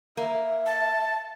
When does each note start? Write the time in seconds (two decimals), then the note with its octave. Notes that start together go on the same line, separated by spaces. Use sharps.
0.17 A#3 E5
0.66 A5